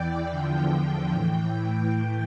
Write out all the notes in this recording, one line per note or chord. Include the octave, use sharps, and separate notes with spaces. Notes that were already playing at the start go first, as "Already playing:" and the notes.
Already playing: E2 E3 D5 G5
E2 D3 F3
A2 E3 G5